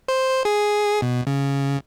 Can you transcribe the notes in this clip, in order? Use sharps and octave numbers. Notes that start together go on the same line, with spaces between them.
C5
C5
G#4
B2
C#3